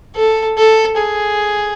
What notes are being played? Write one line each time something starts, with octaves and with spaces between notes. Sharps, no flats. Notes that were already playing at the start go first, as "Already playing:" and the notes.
A4
A4
G#4